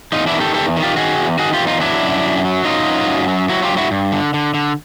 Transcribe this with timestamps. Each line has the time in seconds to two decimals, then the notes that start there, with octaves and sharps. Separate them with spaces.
0.12 E2 D#4 F4
0.27 D4 E4
0.33 D#3
0.40 G4 A4
0.54 E2 G4 A4
0.77 D#3
0.82 F4 G4
0.97 D#3 F#4 G#4
1.18 E2
1.39 D#3 F#4 G#4
1.53 F4 G4
1.61 E2
1.67 D#4 F4
1.81 F#3 D4 E4
2.02 F#2
2.23 F#2
2.45 F#3
2.65 F#2 D#4 F4
2.87 F#3
3.07 F#2
3.28 F#3
3.49 F#3 E4 F#4
3.63 F4 G4
3.71 G2
3.77 E4 F#4
3.91 G2
4.12 D3
4.34 D3
4.54 D3